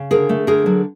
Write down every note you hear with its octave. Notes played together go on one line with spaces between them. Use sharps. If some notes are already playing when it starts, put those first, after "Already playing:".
Already playing: C#3
D3 G#4 A#4
A3
D3 G#4 A#4
F#3